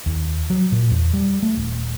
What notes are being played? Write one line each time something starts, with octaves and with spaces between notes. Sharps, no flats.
D#2
F#3
A#2
E2
G3
A3
D#1